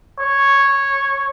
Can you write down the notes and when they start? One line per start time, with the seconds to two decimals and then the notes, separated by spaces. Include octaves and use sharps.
0.20 C#5